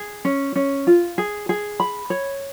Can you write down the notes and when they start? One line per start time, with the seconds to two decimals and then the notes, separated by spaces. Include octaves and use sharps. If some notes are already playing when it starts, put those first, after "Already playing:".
Already playing: G#4
0.25 C#4
0.56 C#4
0.87 F4
1.18 G#4
1.49 G#4
1.80 B5
2.10 C#5